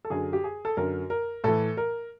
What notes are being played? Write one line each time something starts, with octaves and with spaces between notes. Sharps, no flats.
A4
F#2 D3 G#4
G4
G#4
A4
F#2 D3 A#4
A#4
A2 E3 A4
A#4